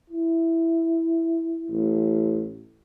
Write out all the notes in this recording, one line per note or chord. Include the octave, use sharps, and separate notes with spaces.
E4
A1